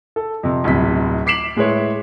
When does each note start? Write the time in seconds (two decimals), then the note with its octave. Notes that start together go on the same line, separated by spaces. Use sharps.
0.16 A4
0.43 F2 C3
0.64 D1 G1 C3 B6
1.26 D6 B6 C7 D7 E7 F#7
1.56 A2 G#3 E4 B4 C#5 C6